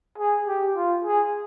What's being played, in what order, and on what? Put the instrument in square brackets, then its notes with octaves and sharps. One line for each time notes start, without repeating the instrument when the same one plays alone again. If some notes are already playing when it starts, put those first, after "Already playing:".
[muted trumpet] G#4
G4
F4
G#4